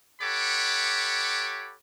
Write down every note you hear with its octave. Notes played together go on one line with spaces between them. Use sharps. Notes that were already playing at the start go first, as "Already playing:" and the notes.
G4 A4 C#5 F#5 B5 D6